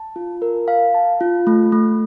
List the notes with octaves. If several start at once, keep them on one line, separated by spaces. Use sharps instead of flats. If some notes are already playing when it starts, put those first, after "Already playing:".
Already playing: A5
F4
A#4
F5
A5
F4
A3
A3